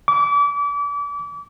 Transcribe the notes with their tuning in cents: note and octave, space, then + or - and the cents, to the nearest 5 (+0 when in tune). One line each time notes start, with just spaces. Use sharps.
D6 -35